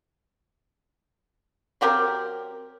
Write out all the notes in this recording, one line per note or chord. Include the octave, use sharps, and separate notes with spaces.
F#3 C4 G4 A#4